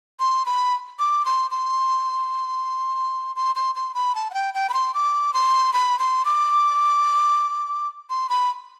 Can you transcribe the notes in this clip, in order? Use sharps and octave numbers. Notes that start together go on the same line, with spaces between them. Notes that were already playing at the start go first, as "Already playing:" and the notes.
C6
B5
D6
C6
C6
C6
C6
C6
B5
A5
F#5
G5
G5
B5
C6
D6
C6
B5
C6
D6
C6
B5